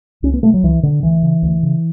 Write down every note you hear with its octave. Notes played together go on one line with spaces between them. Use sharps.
C#2 C#4
B3
B2 A3
F#3
C#2 E3
B2 D3
D2 E3
C#3
D2
C#3